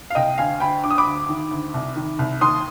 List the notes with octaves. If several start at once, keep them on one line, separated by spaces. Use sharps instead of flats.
F5
C2 D#5 G5
D2 F5 G#5
D2 G5 B5
D3 D6
D#6
B5 D6
D2
D#3
D2
C2
D#3
C2
D#2 C6 D#6